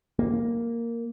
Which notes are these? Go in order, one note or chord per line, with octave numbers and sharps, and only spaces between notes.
A#3